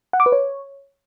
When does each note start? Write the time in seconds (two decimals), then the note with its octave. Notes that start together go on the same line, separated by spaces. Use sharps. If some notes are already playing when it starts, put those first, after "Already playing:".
0.13 F#5
0.20 D6
0.26 B4
0.32 C#5